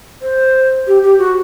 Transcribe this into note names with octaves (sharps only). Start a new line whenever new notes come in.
C5
G4
G4
F#4